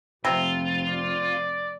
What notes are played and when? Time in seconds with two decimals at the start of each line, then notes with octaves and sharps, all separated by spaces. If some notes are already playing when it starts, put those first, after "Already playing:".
0.25 F1 C3 C4 F4
0.89 D5